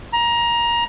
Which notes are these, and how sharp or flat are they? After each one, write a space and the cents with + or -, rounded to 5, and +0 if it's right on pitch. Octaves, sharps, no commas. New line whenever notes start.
A#5 +20